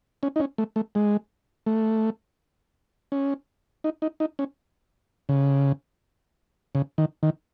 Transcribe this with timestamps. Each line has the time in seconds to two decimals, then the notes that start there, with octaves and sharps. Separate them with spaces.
0.23 C#4
0.36 D#4
0.40 C#4
0.58 A3
0.76 A3
0.95 G#3
1.66 A3
3.12 C#4
3.84 D#4
4.02 D#4
4.20 D#4
4.39 C#4
5.29 C#3
6.75 C#3
6.98 D#3
7.23 D#3